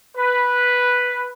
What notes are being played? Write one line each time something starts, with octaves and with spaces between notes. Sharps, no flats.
B4